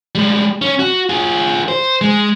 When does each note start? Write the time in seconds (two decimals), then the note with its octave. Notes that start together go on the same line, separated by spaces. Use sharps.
0.15 G3 G#3
0.62 C#4
0.79 F#4
1.09 F4 G#4
1.68 C5
2.01 G#3